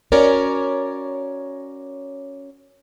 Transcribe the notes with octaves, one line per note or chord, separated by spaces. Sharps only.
C#4 F#4 A#4 C#5 D5